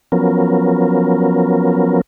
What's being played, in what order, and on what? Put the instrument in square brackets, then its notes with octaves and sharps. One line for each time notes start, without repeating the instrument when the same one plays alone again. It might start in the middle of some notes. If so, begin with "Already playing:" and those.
[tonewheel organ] F3 F#3 B3 C#4 A#4